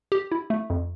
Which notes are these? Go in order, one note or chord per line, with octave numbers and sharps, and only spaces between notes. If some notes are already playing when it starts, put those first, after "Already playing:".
G4
E4
A3
F2